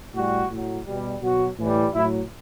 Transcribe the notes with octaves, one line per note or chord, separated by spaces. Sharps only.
A2 G3 F#4
A2 F#3
B2 G3
B2 F#3 F#4
A2 E3 G3
A2 F#3 E4